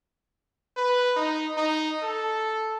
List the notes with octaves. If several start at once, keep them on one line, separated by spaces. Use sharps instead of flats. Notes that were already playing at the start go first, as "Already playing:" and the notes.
B4
D#4
D#4
A4